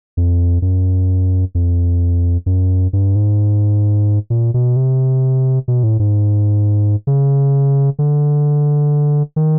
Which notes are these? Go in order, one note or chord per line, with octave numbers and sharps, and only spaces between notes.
F2
F#2
F2
F#2
G2
G#2
A#2
B2
C3
B2
A2
G#2
C#3
D3
D#3